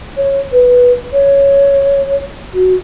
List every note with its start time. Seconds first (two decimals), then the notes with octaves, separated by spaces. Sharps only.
0.16 C#5
0.52 B4
1.12 C#5
2.54 F#4